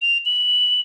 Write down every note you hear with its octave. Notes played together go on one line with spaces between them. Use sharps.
F7
F#7